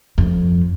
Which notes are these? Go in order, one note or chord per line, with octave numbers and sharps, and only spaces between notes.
F2